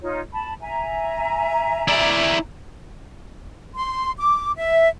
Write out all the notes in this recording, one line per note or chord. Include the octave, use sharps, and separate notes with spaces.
D#4 F4 C#5
A5 B5
E5 G#5 A#5
E4 D5
C6
D6
E5